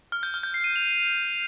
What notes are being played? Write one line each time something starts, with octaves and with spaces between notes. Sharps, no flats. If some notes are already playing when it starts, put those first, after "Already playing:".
F6
G6
F6
G6
C7
D#7
F7
D#7